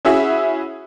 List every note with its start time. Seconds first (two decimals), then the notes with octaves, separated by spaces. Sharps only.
0.05 C#4 E4 F#4 G#4 E5 F#5